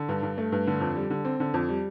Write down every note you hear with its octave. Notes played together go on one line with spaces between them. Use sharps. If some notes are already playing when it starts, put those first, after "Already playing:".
Already playing: D3
G2
G2
A3
G2
D3
F2
G3
D3
C4
D3
F2
G3